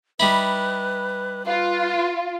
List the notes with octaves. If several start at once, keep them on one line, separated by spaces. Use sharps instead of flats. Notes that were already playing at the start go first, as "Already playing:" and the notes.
G3 D#4 E4 B4 B5
F4 B4